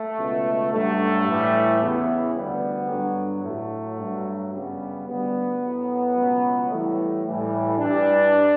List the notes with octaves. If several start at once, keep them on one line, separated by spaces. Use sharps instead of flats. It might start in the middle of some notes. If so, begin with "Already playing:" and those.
Already playing: A3
C#2 B2 F#3
G2 F#3 A3
A2 E3 G3
E2 C#3 E3 B3
D2 D3 G3 B3
G2 D3 F#3
A2 F#3 A3
G2 F#3
F#2 C#3 G3 B3
D2 D3 G3 B3
A2 F#3
C#2 B2 F#3
A2 E3 G3 A3
A2 E3 G3
G2 E3 G3 D4